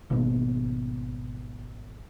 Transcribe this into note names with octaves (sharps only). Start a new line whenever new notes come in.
G#1 B2 A#3 B3